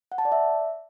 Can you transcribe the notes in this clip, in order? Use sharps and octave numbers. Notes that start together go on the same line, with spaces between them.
F#5
A5
D5
E5